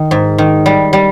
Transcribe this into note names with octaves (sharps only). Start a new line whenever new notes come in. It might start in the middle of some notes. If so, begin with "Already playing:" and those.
Already playing: D#3
G#2
D#3
G3
G3